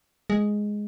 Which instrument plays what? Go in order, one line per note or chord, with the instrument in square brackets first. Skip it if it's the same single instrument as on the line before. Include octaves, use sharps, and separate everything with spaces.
[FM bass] G#3